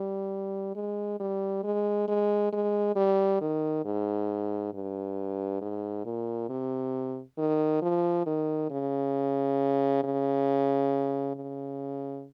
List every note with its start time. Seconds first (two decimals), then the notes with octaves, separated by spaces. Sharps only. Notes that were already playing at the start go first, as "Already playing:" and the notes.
Already playing: G3
0.76 G#3
1.20 G3
1.64 G#3
2.08 G#3
2.53 G#3
2.96 G3
3.41 D#3
3.85 G#2
4.74 G2
5.61 G#2
6.05 A#2
6.49 C3
7.38 D#3
7.82 F3
8.26 D#3
8.70 C#3
10.04 C#3
11.35 C#3